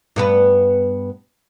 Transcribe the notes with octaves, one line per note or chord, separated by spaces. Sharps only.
G2 B3 B4